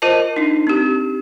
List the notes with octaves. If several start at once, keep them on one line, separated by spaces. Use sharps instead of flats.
F4 A#4 C5 D#5 A5
D4 D#4
C4 G4